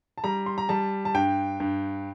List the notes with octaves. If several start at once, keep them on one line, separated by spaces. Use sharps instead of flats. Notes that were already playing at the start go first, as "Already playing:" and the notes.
A5
G3 A#5
C6
A#5
G3 A5
A5
G2 G5
G2